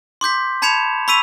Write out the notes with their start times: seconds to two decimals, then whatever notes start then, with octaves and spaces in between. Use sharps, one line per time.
0.21 C6 D6 G6 B6
0.62 A5 B5 G#6 C#7 E7 F7
1.08 B5 C#6 E6 B6 D#7 F7